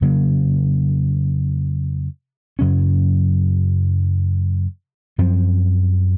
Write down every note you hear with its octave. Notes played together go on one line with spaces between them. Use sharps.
F2 C#3 F#3 A#3
F#2 C#3 F#3 C#4
F#2 F3 C4